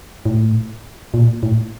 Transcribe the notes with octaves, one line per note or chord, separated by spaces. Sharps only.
A2
A#2
A2